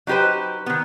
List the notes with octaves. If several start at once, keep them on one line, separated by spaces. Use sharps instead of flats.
F#3 D#4 G4 B4 C5
D#3 B3